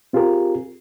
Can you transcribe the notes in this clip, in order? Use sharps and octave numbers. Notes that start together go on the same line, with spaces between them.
C4 F4 G4 G#4 A#4